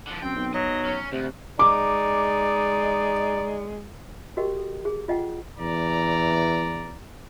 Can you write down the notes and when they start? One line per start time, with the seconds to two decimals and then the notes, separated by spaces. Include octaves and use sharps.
0.07 D3 F3
0.22 F#2 C4 G5
0.36 B1
0.54 F#3 D#5
0.85 C#4
1.12 D2 C3
1.59 G#3 D#4 D5 D6
4.37 F#4 G4 A#4 D#5 G5
4.57 A4
4.85 G#4
5.08 F4 D#5 F#5 G5
5.58 E2 E3 D5 A#5